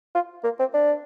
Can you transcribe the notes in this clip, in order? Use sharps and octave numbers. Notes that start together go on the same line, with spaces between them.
F4
A#3
C4
D4